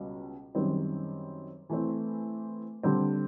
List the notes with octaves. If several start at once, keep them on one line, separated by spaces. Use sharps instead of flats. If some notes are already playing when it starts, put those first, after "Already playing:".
Already playing: C#2 B2 G3
F#2 D#3 G3 C4
E3 A3 C4
D3 G3 C4